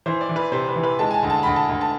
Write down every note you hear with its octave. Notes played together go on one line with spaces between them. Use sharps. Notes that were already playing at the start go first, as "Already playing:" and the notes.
E3 C5
D5
E3
B4
C3 C5
B4
E3
B4
G#3 A5
G#5
A5
D2
A5
D2 B5
A5
D2
A5